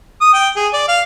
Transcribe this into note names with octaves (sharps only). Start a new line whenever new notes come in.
D#6
G5
G#4
D5
F5